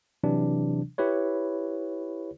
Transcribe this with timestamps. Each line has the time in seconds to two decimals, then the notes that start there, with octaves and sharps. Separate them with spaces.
0.24 C3 E3 F#3 D4
0.98 E4 G4 B4 C#5